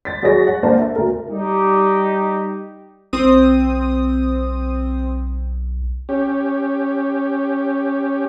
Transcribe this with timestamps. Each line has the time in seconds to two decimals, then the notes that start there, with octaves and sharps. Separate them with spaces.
0.05 A6 B6
0.22 F#3 F#4 G#4 C#5 A#6
0.47 F#5
0.63 A#3 D4 C5 A5
0.79 E5
0.96 D2 A#4
1.30 G3 D#4 G4
3.13 B1 C4 D#6
6.09 C#4 G4